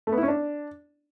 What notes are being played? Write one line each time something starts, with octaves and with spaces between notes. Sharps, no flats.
A3
B3
E4
C#4
D4